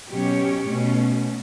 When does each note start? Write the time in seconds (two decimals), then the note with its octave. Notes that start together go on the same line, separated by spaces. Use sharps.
0.11 B2 F#3 C#4 G4 C#5
0.68 B2 A3 C#4